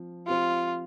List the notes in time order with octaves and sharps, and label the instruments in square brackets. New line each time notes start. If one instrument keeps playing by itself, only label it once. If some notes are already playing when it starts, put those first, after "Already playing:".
Already playing: [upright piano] F3 C4
[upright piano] F3 C4 G4 [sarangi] F4